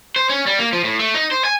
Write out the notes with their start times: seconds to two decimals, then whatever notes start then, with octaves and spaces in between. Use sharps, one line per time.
0.16 C5
0.30 C#4
0.46 G3
0.59 A#3
0.73 F3
0.84 A2
0.99 A3
1.14 D#4
1.31 C5
1.45 G#5